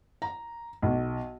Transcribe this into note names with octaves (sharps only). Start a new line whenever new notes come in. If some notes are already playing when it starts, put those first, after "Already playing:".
A#5
B1